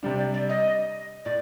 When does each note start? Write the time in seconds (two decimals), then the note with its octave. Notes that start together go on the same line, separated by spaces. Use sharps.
0.03 C3 G3 D4 D5
0.18 D5
0.34 D5
0.49 D#5
1.25 A2 D5